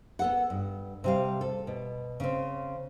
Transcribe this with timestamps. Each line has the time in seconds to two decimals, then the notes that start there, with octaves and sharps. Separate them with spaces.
0.19 B3 A4 F#5
0.50 G2
1.04 C3 G3 F5
1.41 A4
1.67 B2
2.20 C#3 C4